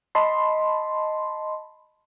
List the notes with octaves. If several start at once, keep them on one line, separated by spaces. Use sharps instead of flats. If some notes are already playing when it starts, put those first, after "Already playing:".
D#5 A5 B5 C6